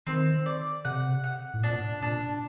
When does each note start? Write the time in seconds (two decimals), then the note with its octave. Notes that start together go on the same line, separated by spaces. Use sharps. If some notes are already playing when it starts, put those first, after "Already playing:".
0.07 D#3 C4
0.46 D5
0.85 C3 F#5
1.24 F#5
1.54 A2
1.63 A#2 D4
2.02 A#2 D4